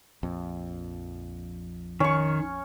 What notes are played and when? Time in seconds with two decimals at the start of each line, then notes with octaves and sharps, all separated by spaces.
0.23 A#1 F2
2.00 D#3 C#4 C#6